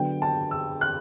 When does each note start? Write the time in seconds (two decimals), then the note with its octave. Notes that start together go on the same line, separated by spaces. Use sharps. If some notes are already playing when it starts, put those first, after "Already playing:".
Already playing: D3 F#3 B3 D4 G5
0.22 A5
0.51 E6
0.81 F#6